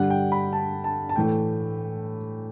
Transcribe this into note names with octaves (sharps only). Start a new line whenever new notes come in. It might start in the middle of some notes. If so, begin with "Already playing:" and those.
Already playing: G2 D3 G3 F#5
G5
B5
A5
A5
A5
A2 E3 A3 G5